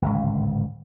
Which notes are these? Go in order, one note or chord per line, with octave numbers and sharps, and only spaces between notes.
D1 G#1 C#2